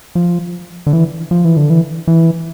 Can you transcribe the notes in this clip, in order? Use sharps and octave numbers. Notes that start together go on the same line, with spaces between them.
F3
D3
E3
F3
E3
D3
E3
E3